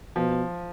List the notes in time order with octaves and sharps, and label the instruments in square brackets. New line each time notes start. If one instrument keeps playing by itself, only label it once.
[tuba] B2 [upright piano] F3